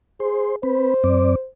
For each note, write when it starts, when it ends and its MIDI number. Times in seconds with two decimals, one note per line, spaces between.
0.20 0.54 68
0.20 0.56 72
0.63 0.94 60
0.63 0.94 71
0.63 1.47 72
1.04 1.35 42
1.04 1.35 60
1.04 1.35 74